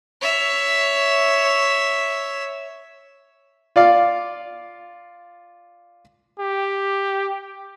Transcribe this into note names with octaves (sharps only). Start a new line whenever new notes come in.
C#5 E5
F4 D5 F5
G4